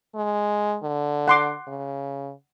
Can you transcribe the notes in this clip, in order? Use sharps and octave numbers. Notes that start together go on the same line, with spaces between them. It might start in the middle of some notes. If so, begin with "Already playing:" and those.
G#3
D3
F#5 C6 D6
C#3